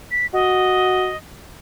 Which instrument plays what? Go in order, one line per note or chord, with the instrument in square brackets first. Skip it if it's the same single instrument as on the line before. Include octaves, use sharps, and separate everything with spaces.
[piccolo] B6
[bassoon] F#4 [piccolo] D#5